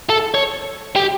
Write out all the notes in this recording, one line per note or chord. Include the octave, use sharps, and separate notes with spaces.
A4
C#5
G4